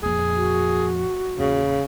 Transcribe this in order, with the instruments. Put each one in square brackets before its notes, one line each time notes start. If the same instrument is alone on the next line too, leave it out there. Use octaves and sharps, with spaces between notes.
[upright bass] F2 A#2 [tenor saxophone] G#4
[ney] F#4
[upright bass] E2 A#2 [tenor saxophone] C#3